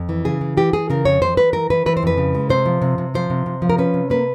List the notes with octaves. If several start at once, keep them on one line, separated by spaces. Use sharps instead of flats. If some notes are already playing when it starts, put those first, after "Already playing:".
Already playing: F2
E3
C#3 G#4
E3
E3 G4
E3 G#4
C#3 A#4
F2 C#5
E3 C5
E3 B4
E3 A#4
E3 B4
E3 B4
C5
F2 B4
C#3
G#3
C3 C5
F3
C3
C3
F3 C5
C3
C3
F3
A#4
C#4 B4
C3
A#3 B4